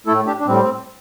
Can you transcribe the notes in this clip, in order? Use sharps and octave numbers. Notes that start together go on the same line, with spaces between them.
A2 A3 E4 A4
D4 G4
D4
A2 G3 C4